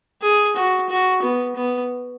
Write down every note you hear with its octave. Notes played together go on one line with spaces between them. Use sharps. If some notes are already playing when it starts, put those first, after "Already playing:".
G#4
F#4
F#4
B3
B3